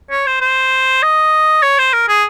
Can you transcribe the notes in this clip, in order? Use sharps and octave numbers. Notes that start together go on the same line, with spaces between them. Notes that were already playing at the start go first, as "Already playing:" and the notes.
C#5
C5
C5
D#5
C#5
C5
A#4
G#4